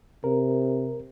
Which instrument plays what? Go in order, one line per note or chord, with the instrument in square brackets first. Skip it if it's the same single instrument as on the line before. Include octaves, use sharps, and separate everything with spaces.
[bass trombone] C3 [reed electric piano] A#4